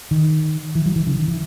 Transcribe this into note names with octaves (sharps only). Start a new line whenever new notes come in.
D#3
E3
F#3
E3
C#3
D#3
E3